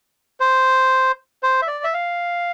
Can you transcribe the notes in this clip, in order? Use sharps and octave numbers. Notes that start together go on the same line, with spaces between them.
C5
C5
E5
D5
E5
F5